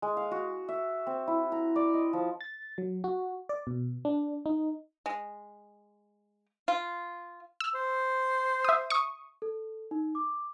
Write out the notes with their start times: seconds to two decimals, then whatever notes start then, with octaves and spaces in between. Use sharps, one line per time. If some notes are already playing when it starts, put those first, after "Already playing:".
0.02 G#3
0.17 F5
0.31 F#4
0.68 E5
1.07 C4
1.27 E4
1.52 A#5
1.76 D5
1.94 D#5
2.13 F3
2.41 A6
2.78 F#3
3.04 F#4
3.49 D5
3.67 B2
4.05 D4
4.46 D#4
5.06 G#3
6.68 F4
7.60 E6
7.75 C5
8.64 E5 D#6
8.90 C#6 D#6
9.42 A4
9.91 D#4
10.15 D6